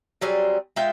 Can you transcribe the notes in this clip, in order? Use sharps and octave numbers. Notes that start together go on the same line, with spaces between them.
F#3 G3 C4 G#4
G#3 F4 E5 G5